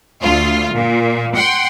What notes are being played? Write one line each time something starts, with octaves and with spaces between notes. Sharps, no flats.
D2 F4
A#2
F#5 G5 C6